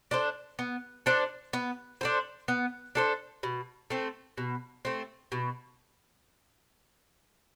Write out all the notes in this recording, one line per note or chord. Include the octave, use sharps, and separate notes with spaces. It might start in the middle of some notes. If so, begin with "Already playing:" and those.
D4 A4 C5
B3
D4 A4 C5
B3
D4 A4 C5
B3
D4 A4 C5
B2
A3 C4
B2
A3 C4
B2